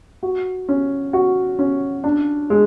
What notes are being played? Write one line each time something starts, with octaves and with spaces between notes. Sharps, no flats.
F#4
C#4
F#4
C#4
D4
G#3